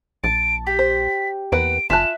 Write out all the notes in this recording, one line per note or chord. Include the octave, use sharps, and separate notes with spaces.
A#1 A5 D7
G4 B6
C5
E2 A#3 B4 F#5 D7
F#1 F4 E5 G#5 A5 F#6 E7